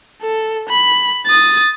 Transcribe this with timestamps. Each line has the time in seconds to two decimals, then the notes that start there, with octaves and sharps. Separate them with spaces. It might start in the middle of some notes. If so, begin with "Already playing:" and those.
0.22 A4
0.69 B5
1.26 D#6 A6